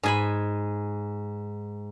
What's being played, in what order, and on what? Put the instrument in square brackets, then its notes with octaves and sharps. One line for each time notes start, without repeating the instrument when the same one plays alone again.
[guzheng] G#2 G#5 B5